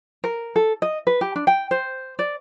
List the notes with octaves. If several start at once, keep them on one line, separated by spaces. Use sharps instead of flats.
A#4
A4
D#5
B4
G4
D4
G5
C5
D5